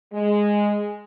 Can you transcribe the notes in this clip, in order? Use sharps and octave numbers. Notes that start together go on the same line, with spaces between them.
G#3